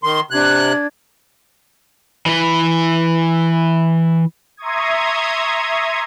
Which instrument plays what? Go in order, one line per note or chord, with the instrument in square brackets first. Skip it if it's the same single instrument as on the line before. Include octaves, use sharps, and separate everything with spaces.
[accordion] D#3 C6
[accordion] C3 F#6 [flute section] D4 G#6
[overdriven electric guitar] E3 B4
[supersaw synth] E5 A#5 C6 C#6 D#6 G#6